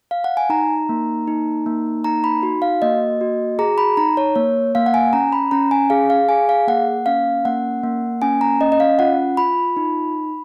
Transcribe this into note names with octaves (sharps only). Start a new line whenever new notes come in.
F5
F#5
G#5
D#4 A#5
A#3
D#4
A#3
D#4 A#5
B5
F#4
F5
A#3 D#5
F#4
G#4 A#5
B5
D#4 A#5
C#5
A#3 C#5
A#3 F5
F#5
G#5
C#4 A#5
B5
C#4 A#5
G#5
G#4 F5
F5
G#4 G#5
F5
A#3 F#5
C#4 F5
A#3 F#5
A#3
C#4 G#5
A#5
C#4 D#5
D#5
F5
F4 F#5
F4 B5
D#4